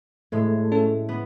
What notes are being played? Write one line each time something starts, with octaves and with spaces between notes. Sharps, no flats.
A2 G#3 A3
C#4 A4
B3